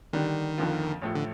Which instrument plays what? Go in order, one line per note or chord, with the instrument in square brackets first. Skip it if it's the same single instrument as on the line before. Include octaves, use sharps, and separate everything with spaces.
[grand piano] D3 G3 D4 [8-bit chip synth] D#3
[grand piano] F2 D3 F3 A#3 F4
A1 A2 F3 A3
[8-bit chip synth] D3